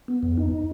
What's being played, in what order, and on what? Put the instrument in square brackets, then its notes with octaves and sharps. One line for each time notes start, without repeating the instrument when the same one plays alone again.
[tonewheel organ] B3
F2
D#4